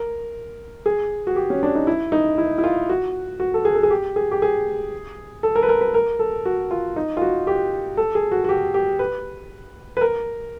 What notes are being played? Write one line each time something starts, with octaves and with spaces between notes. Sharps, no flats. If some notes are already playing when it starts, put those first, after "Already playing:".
Already playing: A#4
G#4
F#4
G4
C#4
D4
D#4
E4
D#4
E4
E4
F4
F#4
F#4
A4
G#4
A4
G#4
G4
G#4
G4
G#4
A4
A#4
B4
A#4
B4
A#4
A4
F#4
F4
D#4
F4
F#4
G4
A4
G#4
F#4
F#4
G4
G4
B4
B4
A#4